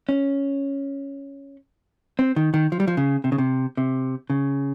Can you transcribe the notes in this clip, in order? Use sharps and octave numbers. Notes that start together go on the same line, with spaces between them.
C#4
C4
D#3
D#3
F3
G3
F3
C#3
C3
C#3
C3
C3
C#3